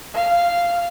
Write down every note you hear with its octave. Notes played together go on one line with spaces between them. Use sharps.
F5